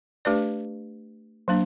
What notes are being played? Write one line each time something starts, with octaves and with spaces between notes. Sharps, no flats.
A3 D4 G4 B4 D5
F#3 A#3 D4